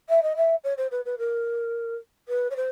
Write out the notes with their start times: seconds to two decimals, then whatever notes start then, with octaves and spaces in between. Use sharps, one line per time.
0.09 E5
0.23 D#5
0.36 E5
0.64 C#5
0.78 C5
0.91 B4
1.05 B4
1.18 A#4
2.28 B4
2.50 C#5
2.56 C5